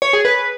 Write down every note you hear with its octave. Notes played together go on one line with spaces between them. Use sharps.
C#5
G#4
B4